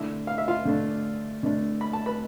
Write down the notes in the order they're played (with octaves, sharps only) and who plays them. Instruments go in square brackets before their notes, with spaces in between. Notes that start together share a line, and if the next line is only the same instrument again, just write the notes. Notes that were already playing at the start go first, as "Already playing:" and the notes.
Already playing: [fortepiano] D3 A3 D4 E4 E5
F5
E5
F4 F5
D3 A3 D4
D3 A3 D4
B5
A5
B4 B5